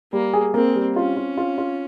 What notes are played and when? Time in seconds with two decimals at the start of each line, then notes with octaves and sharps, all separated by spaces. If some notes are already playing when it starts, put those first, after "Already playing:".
0.13 G3 A#3
0.33 G#4
0.54 A#3 C4
0.75 G3
0.96 C#4 F4
1.17 F4
1.37 F4
1.58 F4